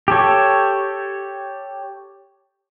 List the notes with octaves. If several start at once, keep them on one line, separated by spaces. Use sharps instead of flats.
G4 A4 C#5